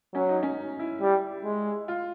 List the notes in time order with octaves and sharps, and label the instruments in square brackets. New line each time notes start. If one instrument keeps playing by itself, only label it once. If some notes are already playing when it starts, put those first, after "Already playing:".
[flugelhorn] F#3 [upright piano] C#4
[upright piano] D#4
C#4
D#4
E4
[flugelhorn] G3
G#3
[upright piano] F4